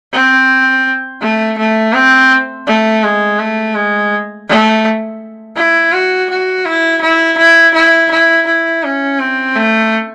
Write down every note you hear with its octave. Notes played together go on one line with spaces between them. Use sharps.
C4
A3
A3
C4
A3
G#3
A3
G#3
A3
E4
F#4
F#4
E4
E4
E4
E4
E4
E4
C#4
C4
A3